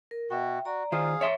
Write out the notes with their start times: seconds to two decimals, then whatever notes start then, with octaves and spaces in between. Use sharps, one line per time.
0.11 A#4
0.30 B2 F#4 E5 G5
0.65 F#4 D5 A#5
0.92 D#3 F4 G#4 C5 F5
1.21 C#5 E5 C6